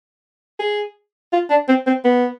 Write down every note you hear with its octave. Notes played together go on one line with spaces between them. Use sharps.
G#4
F4
D4
C4
C4
B3